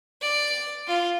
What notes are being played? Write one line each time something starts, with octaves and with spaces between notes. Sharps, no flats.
D5
F4